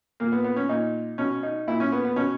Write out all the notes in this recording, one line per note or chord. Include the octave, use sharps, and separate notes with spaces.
A#2 A#3
B3
B3
C#4
A#2 D#4
B2 C#4
D#4
A#2 E4
C#4
B3
B3
B2 C#4